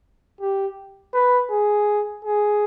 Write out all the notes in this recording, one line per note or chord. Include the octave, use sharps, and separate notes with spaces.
G4
B4
G#4
G#4